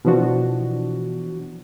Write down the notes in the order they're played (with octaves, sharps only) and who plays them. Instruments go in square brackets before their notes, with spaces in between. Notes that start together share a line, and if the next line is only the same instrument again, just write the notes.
[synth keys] B2 E3 F3 D4 F#4